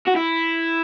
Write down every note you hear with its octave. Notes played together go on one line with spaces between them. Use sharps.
F#4
E4